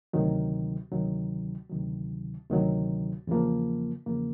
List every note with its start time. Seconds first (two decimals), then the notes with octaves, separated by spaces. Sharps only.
0.13 D2 C3 D#3 F#3
0.91 D2 C3 D#3 F#3
1.70 D2 C3 D#3 F#3
2.49 D2 C3 D#3 F#3
3.27 E2 C#3 F3 A#3
4.06 E2 C#3 F3 A#3